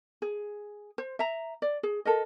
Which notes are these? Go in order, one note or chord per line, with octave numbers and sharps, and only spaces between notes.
G#4
C5
E5 A#5
D5
G#4
A4 A#4 D#5